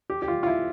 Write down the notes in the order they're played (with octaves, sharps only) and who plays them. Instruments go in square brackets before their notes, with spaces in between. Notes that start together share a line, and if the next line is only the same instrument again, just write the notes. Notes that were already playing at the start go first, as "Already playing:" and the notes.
[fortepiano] G4
G4
F4
F4
E4